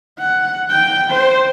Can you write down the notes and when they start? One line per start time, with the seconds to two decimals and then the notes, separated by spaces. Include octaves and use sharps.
0.19 F#5
0.70 G5
1.10 C5